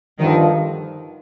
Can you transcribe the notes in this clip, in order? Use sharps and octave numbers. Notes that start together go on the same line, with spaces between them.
G2 D3 D#3 F3